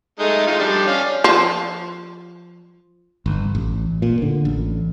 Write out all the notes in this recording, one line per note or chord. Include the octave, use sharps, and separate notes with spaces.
G#3 A3 D#4
G#3 D#4 F4
F3 G3 D4
C#4 D5 F5
F3
G1
A1
A#2
D3
A1